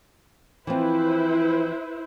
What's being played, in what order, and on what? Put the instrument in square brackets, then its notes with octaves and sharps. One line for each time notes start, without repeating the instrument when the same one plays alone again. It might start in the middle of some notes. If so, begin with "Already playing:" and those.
[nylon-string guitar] E3 F3 C4 [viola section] E4 B4 C5